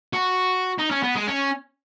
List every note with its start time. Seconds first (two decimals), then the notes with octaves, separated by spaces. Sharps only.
0.13 F#4
0.78 D#4
0.91 C#4
1.03 B3
1.15 G#3
1.27 C#4